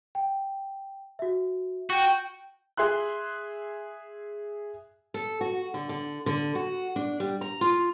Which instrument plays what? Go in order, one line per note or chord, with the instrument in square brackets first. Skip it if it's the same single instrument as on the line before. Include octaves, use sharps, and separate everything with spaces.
[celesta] G5
F#4 E5
[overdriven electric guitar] F#4 [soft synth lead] G5
[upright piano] G#4 E5 C6 F#6
[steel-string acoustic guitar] A4
F#4
D3
D3
D3
F#4
D4
G3
A#5
F4